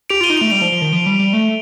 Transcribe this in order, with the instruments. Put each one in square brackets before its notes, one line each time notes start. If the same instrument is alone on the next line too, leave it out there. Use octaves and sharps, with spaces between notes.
[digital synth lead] G4 [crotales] D7 F7
[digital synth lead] F4 [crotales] D#7 G7
[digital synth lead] D#4
[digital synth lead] A3 [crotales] D7 F7
[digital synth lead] G3 [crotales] D7 F7
[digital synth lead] F3
F3
D#3
F3
G3
G3
A3